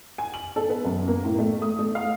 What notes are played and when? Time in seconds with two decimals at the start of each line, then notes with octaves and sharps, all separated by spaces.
0.18 G#5
0.34 F#7
0.56 A4
0.69 B3
0.85 F#2
1.08 A#3
1.25 A2
1.38 A3
1.62 D#6
1.79 A3
1.95 F5